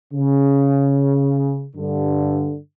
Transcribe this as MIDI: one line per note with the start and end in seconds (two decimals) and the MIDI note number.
0.13 1.65 49
1.76 2.56 43
1.76 2.56 50